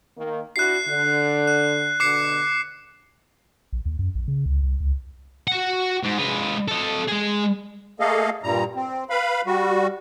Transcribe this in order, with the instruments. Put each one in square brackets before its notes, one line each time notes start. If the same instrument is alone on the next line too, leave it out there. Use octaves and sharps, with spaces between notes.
[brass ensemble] D#3 A#3
[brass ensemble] D4 E4 F#4 [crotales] F#6 C7
[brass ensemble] D3
[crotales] F#6
[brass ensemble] B2 D3 [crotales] D6 C7 C#7
[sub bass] A#1
D#2
F#2
A#1
C#3
C#2
C2
C#2
[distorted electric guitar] F#4 F#5
G#2
G#3 B4
A4 D#5
G#3 G#4
[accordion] A3 A#3 G#4 A4 D#5 F5
G2 A#2 G3 A#5
C4
B4 F5 B5
G3 F#4